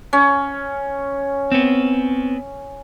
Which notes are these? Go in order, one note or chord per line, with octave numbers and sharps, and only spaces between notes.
C#4
B3 C4